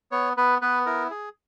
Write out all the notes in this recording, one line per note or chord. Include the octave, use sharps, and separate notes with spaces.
B3 C#5
B3 B4
B3 B4
E4 A#4
G#4